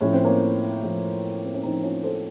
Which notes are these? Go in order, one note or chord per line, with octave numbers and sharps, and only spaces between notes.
A2 F3 C#4
C4
A#3 C#4
A2 F3
C4
C#4
A2 F3 C4 D#4
C#4 F4
A4 C5